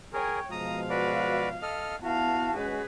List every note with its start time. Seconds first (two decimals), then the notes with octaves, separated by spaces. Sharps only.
0.13 G#4 A#4 C#5 G5
0.51 B2 F3 G#3 F5 A#5 D#6
0.90 F#4 B4 D5
1.62 A4 D#5 F6
2.03 B3 E4 F#4 F5 A5
2.55 G#3 C#4 G#4 B4